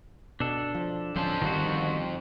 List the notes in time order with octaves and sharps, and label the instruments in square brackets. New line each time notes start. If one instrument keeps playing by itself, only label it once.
[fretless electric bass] B2 [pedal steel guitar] D4 A4
[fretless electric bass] F3
[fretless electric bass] D1 F3 C#4 [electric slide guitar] F2 C5 A5
[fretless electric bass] G1 G3 [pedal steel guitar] D#3 F#4